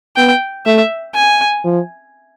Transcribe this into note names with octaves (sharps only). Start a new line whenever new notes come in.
B3 G5
A3 E5
G#5
F3